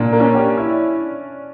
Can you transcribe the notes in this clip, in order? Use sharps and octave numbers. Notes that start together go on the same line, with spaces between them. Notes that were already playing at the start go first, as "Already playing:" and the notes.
Already playing: A#2 D4
A#3
C#4
G4
E4